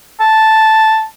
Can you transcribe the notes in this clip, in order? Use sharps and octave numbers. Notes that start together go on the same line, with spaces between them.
A5